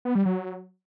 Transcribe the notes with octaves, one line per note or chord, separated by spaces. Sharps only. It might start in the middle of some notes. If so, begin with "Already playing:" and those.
B3
G3
F#3